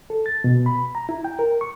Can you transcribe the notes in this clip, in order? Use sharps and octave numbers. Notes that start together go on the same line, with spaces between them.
A4
A6
B2
B5
A#5
E4
G5
A#4
C#6